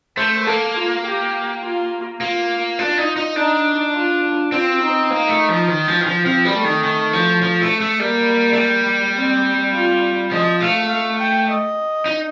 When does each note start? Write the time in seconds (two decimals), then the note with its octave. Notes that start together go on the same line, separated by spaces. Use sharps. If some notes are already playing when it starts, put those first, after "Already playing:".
0.17 A3 C5
0.47 A#3 A4
0.76 F4
1.04 G4
1.62 F4
2.20 A#3 F4
2.78 D4 F4
2.98 D#4
3.16 D#4
3.36 D4 D#4
3.94 F4
4.52 C4 F4
4.81 D#4
5.11 A#3
5.29 A3
5.49 F3
5.68 D#3
5.88 F3
6.01 D#3
6.07 F3
6.25 F3 C4
6.45 G3
6.54 A3
6.64 D#3
6.84 D#3
7.13 F3
7.42 F3
7.61 A3
7.81 A3
7.99 G3 A#3
8.53 A3
8.57 G3
9.16 C4
9.73 F4
10.31 F3 D#5
10.61 A3 F5
10.89 F5
11.19 G5
11.48 D#5
12.06 D#4